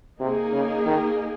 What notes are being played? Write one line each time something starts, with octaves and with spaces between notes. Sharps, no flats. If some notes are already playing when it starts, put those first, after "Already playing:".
C3 A#3 D#4 G#4
C#3
D#3